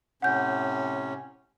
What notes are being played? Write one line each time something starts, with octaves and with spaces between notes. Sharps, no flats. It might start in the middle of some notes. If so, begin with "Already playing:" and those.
A2 C3 C#4 F#5 G6